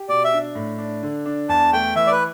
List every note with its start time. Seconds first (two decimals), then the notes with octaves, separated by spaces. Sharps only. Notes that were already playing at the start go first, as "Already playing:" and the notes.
Already playing: G4
0.08 B2 D5
0.24 E5
0.33 D4
0.55 A2
0.78 D4
1.03 D3
1.26 D4
1.49 E2 A5
1.73 A3 G5
1.95 E3 E5
2.07 D5
2.12 B4